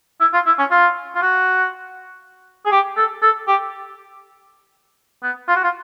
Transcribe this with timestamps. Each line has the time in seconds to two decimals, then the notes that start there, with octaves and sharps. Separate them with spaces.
0.20 E4
0.34 F4
0.46 E4
0.59 C#4
0.71 F4
1.15 F4
1.22 F#4
2.66 G#4
2.72 G4
2.97 A4
3.22 A4
3.47 G4
5.23 B3
5.48 F4
5.56 F#4
5.64 F4